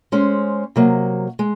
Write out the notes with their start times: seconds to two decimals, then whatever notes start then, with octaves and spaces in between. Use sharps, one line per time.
0.12 G#3 C#4 G#4 C5
0.76 C3 F#3 A#3
1.39 G#3